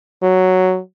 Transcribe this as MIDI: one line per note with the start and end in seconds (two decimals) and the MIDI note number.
0.23 0.79 54